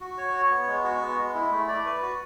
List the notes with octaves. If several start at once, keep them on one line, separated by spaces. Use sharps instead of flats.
F#4
C#5
C#5
B3
G#3
F#4
B3
G#3
E4
A3
D5
B4
F#4